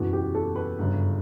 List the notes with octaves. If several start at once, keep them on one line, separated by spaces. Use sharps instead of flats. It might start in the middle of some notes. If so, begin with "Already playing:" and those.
Already playing: F#1 E2 B2 F#4
G4
A4
B4
G1 F#2 C#3